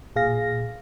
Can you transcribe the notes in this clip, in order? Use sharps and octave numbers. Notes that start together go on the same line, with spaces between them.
A#2 G#4 F5 A#6